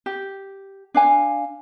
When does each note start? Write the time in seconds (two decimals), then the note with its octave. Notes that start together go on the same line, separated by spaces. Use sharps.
0.06 G4
0.94 D4 F5 G#5